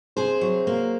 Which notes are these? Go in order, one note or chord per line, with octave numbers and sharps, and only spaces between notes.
C3 G#4 C5
F#3
A#3